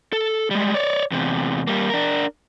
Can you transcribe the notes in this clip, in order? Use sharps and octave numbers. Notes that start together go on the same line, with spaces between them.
A4
G3 G#3
C#5 D5
E2 C3
G3 A#3
D4 A#4